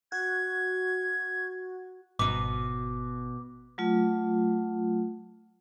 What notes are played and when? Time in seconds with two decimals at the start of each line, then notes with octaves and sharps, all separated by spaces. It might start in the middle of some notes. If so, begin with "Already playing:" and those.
0.12 F#4 G#6
2.19 G#1 B2 D#4 D6
3.78 F#3 A3 F4